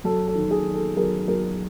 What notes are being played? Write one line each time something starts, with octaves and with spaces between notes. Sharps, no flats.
F#2 A4
A4
D#3
G#4
D#3
A4
F#2 G#4 A#4
F#2 G#4 A#4